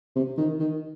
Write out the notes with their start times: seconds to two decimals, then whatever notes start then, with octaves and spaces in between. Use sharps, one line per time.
0.16 C3
0.38 D#3
0.60 D#3